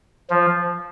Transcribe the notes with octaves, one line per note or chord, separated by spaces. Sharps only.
F3